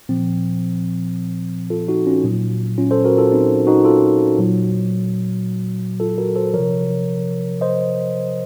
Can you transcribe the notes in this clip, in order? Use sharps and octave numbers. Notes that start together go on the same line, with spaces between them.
A#2 F3 C4
F4 A4
D#4 F#4
C#4 F4
A#2 F#3
C#4 F4
A4 C5
F#4 A#4
F4 A4
C4 D#4
D#4 F#4
F4 A4
A#2 F#3
F4 A4
F#4 A#4
A4 C5
C3 F3 A#4 C#5
C5 D#5